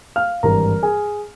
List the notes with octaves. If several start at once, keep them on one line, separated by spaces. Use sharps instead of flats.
F5 F6
G#1 G2 E3 A#4 A#5
G#4 G#5